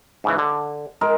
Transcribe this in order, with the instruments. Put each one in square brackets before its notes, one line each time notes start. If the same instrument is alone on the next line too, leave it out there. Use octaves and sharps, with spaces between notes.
[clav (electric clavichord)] G#2 C#3 E3
D3
[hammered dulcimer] G#3 A#4